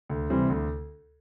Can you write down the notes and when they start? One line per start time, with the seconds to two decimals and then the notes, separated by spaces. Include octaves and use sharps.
0.09 D2
0.29 C3 E3 G3 C4
0.50 D2